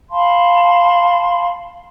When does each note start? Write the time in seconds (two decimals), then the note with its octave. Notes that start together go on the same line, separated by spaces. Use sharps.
0.10 F5 A5 B5 C6